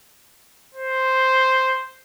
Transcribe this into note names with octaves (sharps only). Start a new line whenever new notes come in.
C5